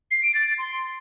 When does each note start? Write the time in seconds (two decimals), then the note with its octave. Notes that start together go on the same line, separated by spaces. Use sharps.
0.11 C7
0.23 D7
0.35 A6
0.47 A6
0.58 C6